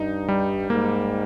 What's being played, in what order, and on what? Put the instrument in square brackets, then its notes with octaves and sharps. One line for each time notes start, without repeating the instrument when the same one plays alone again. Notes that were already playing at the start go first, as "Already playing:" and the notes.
Already playing: [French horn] G2 [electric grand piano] D#4
[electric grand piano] G3
[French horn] G#2 [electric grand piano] A#3